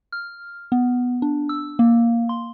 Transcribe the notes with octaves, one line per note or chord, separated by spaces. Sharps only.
F6
B3
D4
E6
A#3
C6